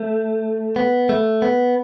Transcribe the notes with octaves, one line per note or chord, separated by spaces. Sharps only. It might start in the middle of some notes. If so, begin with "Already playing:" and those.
Already playing: A3
B3
A3
B3